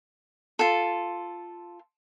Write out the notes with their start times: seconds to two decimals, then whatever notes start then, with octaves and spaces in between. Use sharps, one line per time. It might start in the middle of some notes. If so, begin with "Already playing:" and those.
0.59 F4 A4